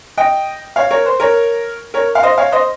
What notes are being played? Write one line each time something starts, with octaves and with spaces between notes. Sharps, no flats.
D#5 G5
C#5 F5
A#4 C#5
C5
A#4 C#5
A#4 C#5
F5
C5 D#5
C#5 F5
C5 D#5